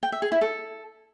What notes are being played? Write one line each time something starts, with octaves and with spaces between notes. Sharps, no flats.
G5
E5
G#4
E4
A4